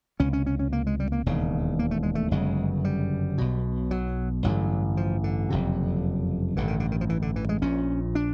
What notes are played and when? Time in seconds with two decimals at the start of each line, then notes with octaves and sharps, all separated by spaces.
0.20 C#2 C3 C#4
0.33 C#4
0.46 C#4
0.59 C#4
0.73 A#3
0.87 G#3
1.00 G3
1.12 A#3
1.26 E1 D#2 C#3
1.79 A#3
1.91 A3
2.03 G#3
2.15 A3
2.31 G1 F#2 C#3 G#3
2.85 G3
3.38 B1 B2
3.91 F#3
4.44 A1 G2 D3 F#3
4.97 F3
5.24 D3
5.50 F#1 F2 C3
6.56 A1 G2 D3 E3
6.68 D#3
6.80 D3
6.92 D#3
7.01 F3
7.09 E3
7.22 D3
7.36 E3
7.49 G#3
7.62 A#1 A#2 C#4
8.15 D4